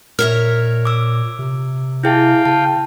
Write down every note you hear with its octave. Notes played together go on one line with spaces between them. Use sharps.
A#2 A#4 C#5 E5 F6
D6 E6
C3
E4 G#4 F5 G5 A5
C#3 A5